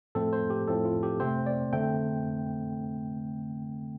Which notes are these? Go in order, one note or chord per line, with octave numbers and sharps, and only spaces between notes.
A2 F3 A3 C4 A4
C5
G4
A2 F3 C4 A4
F4
G4
C3 A3 C4 C5
D5
D3 A3 C4 G5